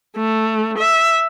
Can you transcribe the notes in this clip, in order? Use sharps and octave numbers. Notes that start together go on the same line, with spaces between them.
A3
E5